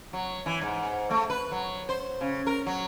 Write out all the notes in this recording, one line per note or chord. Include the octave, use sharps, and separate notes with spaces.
F#3
E3
G#2
A3
B4
F#3
C5
C#3
A#4
F#3